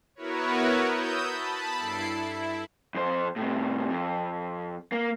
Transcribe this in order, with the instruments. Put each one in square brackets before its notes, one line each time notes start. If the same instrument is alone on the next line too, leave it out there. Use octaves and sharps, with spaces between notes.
[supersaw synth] B3 E4 F#4 A#4 B4 C#5
D#6 E6 G6
A5 B5
G2 E4 A4 C7 D7
E4
[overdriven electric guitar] F2 C5
A2 C3
F2
A#3